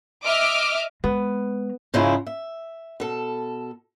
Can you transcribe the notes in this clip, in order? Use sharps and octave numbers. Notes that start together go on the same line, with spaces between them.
D#5 E5 D6 F6
G#3 A#3 B3
G#2 C#3 F3 G#3 C#4 E4
E5
B2 A4